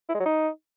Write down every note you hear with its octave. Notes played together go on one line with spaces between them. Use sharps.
E4
G#3
F#3
D#4